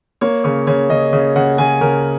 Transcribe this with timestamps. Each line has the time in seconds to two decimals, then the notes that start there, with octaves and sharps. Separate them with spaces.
0.21 A#3 C#5
0.44 C#3 C#5
0.67 C#3 C#5
0.90 C#3 D#5
1.13 C#3
1.36 C#3 F#5
1.58 C#3 G#5
1.81 C#3 A#4